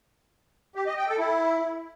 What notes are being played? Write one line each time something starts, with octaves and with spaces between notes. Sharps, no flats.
G4
D#5
G5
A4
E4